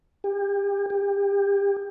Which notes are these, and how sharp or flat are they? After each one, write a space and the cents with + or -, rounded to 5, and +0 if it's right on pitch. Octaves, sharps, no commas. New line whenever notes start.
G4 +35
G4 +30